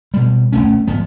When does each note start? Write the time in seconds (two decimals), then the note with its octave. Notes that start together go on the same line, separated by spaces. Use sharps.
0.14 B2 G3
0.52 D#1 G2 A3 C#4
0.87 G#1 F3 B3